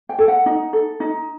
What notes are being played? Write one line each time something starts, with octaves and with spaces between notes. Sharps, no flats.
G5
A4
F#5
D#4
A4
D#4